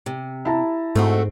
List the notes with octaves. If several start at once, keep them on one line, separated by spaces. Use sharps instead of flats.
C3
E4 A5 A#5
G#2 A3 C4 F#4